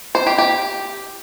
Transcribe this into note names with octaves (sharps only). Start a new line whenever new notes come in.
C5
G4
G4